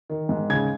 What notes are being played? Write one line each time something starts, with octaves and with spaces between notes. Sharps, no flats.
D#3
G#2
C#3 G#6